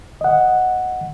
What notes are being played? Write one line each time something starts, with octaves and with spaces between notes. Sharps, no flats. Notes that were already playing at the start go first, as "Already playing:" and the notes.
D#5 F#5